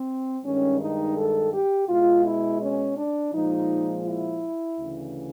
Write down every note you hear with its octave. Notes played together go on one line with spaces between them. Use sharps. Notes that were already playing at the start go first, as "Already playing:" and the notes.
Already playing: C4
G2 D#3 G#3 C#4
D#4
A4
G4
B2 G#3 F4
E4
C#4
D4
A#2 F3 G#3 D#4
E4
D2 C#3 E3